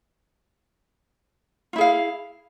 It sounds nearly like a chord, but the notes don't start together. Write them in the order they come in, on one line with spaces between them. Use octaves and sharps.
F4 E4 G#4 F5